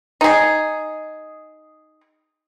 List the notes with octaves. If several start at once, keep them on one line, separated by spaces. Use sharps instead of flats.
D#4 G#4